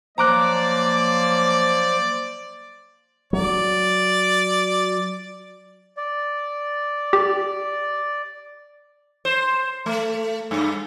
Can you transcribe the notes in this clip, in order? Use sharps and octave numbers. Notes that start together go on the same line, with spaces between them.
F3 F#3 A#3 C5 D5 A#5 D6 F#6
F#3 D5
D5
G4
C5
A3
G2